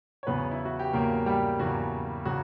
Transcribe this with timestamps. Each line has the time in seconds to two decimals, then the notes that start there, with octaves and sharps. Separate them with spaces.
0.23 C#5
0.27 E2 C#3 F#3 B3 B4
0.51 E4
0.65 F#4
0.79 G4
0.93 E2 C#3 F#3 A#3 A#4
1.26 G3 G4
1.59 E2 C#3 F#3 F#4
2.25 C#3 F#3 F#4